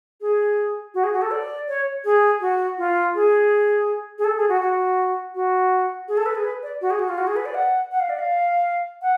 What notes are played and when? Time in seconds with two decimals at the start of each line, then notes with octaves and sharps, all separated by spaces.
0.21 G#4
0.94 F#4
1.04 G#4
1.13 F#4
1.22 A4
1.31 D5
1.68 C#5
2.05 G#4
2.41 F#4
2.78 F4
3.15 G#4
4.19 G#4
4.24 A4
4.37 G#4
4.49 F#4
4.61 F#4
5.35 F#4
6.08 G#4
6.17 A4
6.26 B4
6.35 G#4
6.44 B4
6.63 D5
6.81 F#4
6.91 G#4
6.99 F#4
7.09 F4
7.18 F#4
7.27 G#4
7.36 B4
7.46 D5
7.55 F#5
7.91 F#5
8.00 F5
8.10 D5
8.19 F5
9.02 F#5